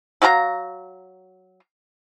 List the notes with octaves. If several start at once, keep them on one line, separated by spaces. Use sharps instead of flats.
F#3 F#4 F5 A#5